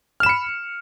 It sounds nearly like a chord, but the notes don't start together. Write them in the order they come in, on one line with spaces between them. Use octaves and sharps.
F6 E7 B5 C#7